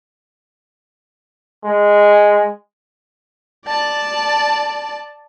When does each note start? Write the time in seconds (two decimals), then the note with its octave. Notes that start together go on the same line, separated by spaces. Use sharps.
1.65 G#3
3.66 D5 A5